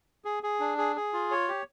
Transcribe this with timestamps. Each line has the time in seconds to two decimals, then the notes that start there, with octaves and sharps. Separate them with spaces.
0.25 G#4
0.43 G#4
0.60 D4
0.78 G#4
0.96 G#4
1.13 F4
1.31 C#5
1.48 G4